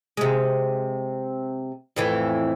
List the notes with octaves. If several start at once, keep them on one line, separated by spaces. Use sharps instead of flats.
C3 G#3
F2 A2 E3